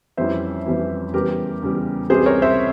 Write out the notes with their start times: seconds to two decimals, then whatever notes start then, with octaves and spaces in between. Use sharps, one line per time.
0.17 F2 E3 G3 C#4 E4 C5 E5
0.66 F2 E3 G3 C#4 E4
1.14 E2 C#3 E3 G3 G4 A#4
1.62 E2 C#3 E3 G3
2.10 C#2 C3 E3 G3 G#4 C5
2.26 A#4 C#5
2.42 C5 E5